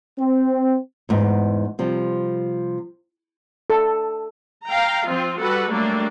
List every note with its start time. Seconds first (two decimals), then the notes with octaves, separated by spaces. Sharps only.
0.19 C4
1.09 E2 G#2 B3
1.79 C3 F3 G3
3.70 A4
4.66 F5 G5 A#5
5.06 F3 C4 F4
5.39 G3 F#4 A4 B4 F#5
5.70 F#3 G3 A3 A#3 D4